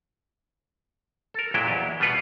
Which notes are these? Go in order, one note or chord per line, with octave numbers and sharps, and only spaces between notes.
A4 A#4
F2 A#2 F#3 G#3 E4 G5
E2 G4
B2 G3 B3 F4 B4 F#5